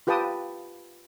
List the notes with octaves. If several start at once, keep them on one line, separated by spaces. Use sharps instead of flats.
F4 G4 B4 G5 A5 D#6